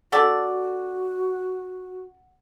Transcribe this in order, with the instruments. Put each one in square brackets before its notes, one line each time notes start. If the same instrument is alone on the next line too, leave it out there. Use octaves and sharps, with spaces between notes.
[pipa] C#4 A4 D5 [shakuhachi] F#4 [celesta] F#5